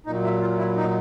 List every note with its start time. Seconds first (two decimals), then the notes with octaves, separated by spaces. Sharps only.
0.06 A#2 F#3 D#4
0.24 E4
0.41 F4
0.58 E4
0.76 D#4